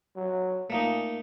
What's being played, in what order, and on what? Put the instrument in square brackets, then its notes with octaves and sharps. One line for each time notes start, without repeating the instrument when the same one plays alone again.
[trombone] F#3
[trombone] A#2 [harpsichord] A3 A#3 D#4